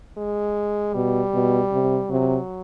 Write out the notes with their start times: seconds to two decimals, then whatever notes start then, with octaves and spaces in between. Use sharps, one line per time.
0.17 G#3
0.94 B2 G3
1.34 B2
1.72 C3
2.11 C3 F#3